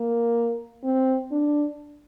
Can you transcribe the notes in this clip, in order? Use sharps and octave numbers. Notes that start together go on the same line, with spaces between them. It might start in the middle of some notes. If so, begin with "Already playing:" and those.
Already playing: A#3
C4
D4